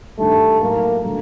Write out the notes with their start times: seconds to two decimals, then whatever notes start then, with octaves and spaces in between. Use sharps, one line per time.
0.18 G2 D#3 G3 A3
0.61 A2 F#3 A3 A#3
1.04 D3 F#3 A3 D4